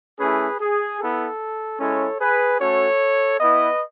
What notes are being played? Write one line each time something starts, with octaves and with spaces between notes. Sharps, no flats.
A3 C#4 E4 G#4 B4
G#4
B3 E4 A4
G#3 C#4 E4 A4 C#5
G#4 B4
A3 C#4 F#4 A4 C#5
B3 E4 B4 D#5